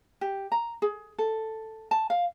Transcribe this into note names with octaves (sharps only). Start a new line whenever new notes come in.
G4
A#5
G#4
A4
A5
F5